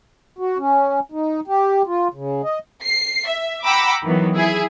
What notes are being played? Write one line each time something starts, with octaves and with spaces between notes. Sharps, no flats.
F#4
C#4
D#4
G4
F4
C#3
D#5
C7
E5
F#5 G5 A#5 B5 D6 E6
D#3 E3 F#3 B3
E4 G#4 E5